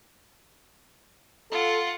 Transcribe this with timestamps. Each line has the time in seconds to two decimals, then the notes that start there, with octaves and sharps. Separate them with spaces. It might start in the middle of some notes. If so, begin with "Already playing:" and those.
1.51 F4 A4 F#5